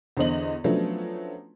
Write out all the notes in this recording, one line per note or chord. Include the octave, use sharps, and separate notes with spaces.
E2 D3 C5 D#5 F#7
F3 F#3 A3 B3 C#4 D4